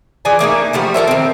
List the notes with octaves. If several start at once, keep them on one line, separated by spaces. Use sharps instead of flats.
E3 G#4 D5 G#5
A3 A#3 C#4 D#4
F3 G3 A3 F#4
A4 A#4 C#5 E5
D#3 C4